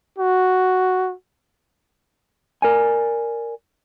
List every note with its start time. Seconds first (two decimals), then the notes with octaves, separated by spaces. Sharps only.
0.19 F#4
2.62 A#4 D5 G#5